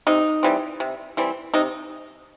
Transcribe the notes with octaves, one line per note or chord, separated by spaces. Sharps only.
C3 D#4
E3 G3 C4
C3
E3 G3 C4
C3 D#4